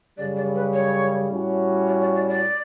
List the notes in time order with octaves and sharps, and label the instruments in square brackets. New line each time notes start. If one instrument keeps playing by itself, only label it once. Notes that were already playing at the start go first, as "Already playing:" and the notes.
[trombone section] F#2 C#3 G3 [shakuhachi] D5
[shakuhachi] D5
B4
C#5
[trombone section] A2 G3 C#4 F#4
[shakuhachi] D5
D5
D5
D5